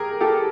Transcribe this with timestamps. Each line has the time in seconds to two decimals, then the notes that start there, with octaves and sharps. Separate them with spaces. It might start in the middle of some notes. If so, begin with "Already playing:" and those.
Already playing: G4 G#4 A#4
0.21 G4 A4